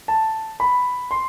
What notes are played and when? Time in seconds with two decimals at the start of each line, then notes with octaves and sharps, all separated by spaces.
0.08 A5
0.60 B5
1.11 C6